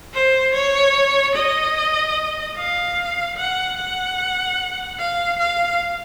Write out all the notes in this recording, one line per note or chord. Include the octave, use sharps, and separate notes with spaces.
C5
C#5
D#5
F5
F#5
F#5
F5
F5